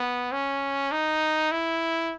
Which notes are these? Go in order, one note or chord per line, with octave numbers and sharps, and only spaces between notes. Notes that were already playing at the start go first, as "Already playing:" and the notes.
Already playing: B3
C#4
D#4
E4